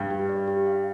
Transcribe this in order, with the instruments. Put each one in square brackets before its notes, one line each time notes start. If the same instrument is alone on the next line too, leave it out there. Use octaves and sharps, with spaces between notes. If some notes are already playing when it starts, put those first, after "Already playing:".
Already playing: [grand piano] G2 G3
[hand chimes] G4
D5
G4
F5